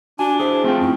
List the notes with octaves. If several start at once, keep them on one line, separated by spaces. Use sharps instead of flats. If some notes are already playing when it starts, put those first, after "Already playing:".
D4 F#4 G#5
E4 G#4 C5
A3 C4 F4 G5
F#2 E4